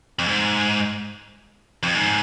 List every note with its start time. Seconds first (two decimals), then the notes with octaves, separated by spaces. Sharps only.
0.19 F2
0.28 G#2
1.83 F2
1.95 G#2